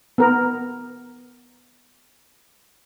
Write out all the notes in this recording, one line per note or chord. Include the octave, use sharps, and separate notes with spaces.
B3 A#4